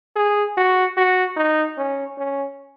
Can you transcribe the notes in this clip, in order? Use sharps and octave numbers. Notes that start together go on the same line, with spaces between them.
G#4
F#4
F#4
D#4
C#4
C#4